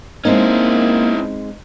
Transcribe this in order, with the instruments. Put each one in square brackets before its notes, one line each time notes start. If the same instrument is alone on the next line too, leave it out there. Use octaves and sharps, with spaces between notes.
[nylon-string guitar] G#3 C4 D#4 [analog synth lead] A#3 [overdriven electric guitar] C#4 E4